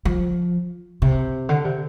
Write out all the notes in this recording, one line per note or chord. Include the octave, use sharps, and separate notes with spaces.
F3
C3
D3
C3